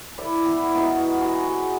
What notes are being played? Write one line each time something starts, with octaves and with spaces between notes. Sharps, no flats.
E4 D5 E5 B5
E3 B3
B3 D#4 E4 F#4
F#4 G#5
G#4 F#5